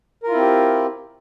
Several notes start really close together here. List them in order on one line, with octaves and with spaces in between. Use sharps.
A#4 F4 E4 C4 G4